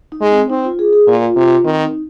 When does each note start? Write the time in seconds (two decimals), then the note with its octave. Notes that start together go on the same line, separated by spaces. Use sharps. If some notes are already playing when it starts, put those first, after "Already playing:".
0.12 D#4
0.21 G#3
0.31 C4
0.50 C4 D#4
0.64 F4
0.79 G#4
0.93 G#4
1.07 A#2 F4
1.36 C3
1.65 D#3 C4
1.84 D#4